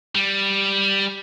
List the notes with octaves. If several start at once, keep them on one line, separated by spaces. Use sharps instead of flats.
G3